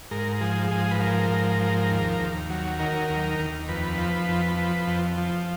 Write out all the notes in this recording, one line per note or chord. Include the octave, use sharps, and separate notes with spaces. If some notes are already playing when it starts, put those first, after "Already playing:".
G#2 A#4
F3 G#4
G#2 G#4
B4
F3 A#4
G#2
F3
D#2
D#2
F#3
D#3 A#4
D#2
D#2
F2 B4
F3
F2
F3
F2
F3